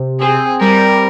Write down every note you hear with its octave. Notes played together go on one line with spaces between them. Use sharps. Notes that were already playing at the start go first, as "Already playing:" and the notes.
Already playing: C3
C4 G#4
G3 A#4